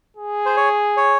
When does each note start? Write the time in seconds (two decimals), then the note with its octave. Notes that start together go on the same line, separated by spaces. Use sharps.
0.17 G#4
0.46 C5
0.57 C#5
0.97 C#5